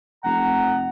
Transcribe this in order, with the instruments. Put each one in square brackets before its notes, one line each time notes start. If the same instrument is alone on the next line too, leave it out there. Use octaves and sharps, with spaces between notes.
[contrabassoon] F1 [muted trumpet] F#5 [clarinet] A#5